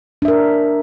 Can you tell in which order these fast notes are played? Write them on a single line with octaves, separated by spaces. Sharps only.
D4 E5 A#4